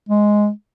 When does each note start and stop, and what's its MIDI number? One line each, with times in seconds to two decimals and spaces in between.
0.09 0.50 56